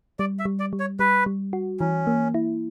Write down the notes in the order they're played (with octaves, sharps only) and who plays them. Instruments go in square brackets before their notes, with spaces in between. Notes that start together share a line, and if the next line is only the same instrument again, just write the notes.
[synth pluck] G3 [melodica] D5
[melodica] E5
[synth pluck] G3
[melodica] D5
[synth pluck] G3
[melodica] C#5
[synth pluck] G3 [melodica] B4
[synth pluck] G3
F#4
[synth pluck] E3 [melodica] C#4
[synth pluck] A#3
E4